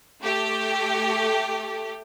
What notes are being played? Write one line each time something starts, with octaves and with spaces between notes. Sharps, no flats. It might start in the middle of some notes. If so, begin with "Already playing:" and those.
A3 G4